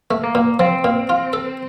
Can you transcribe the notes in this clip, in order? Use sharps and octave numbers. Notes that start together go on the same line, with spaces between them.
A3
A#3
A#2
F3 C4
A#2
F4
A4